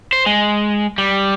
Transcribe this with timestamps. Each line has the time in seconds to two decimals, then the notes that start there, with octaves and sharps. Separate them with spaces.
0.13 C5
0.26 G#3
0.98 G3